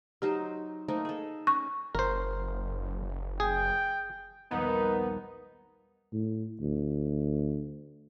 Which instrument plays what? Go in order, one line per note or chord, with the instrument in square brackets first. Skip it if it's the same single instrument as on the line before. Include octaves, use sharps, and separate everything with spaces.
[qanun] F#3 D#4 C5 [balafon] G4
[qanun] A3 A#3 D#4 [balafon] C5
[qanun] G#4 A4
[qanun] C#4 [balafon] C#6
[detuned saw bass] F#1 [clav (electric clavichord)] A#4 C5
[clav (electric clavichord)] G#4 [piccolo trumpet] G5
[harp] A#1 D#2 G3 [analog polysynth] B3 [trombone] D#4
[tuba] A2
D2